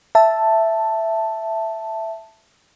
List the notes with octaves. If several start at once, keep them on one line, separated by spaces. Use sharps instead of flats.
E5 A5